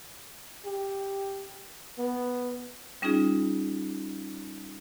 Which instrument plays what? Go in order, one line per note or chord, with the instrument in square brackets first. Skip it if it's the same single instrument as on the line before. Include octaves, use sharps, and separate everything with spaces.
[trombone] G4
B3
[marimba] G3 C#4 D#4 F4 G#4